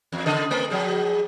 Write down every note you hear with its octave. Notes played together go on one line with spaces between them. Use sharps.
E2
C#3 A4 D#5
A3 C4 A#4
F3 F#3 G#4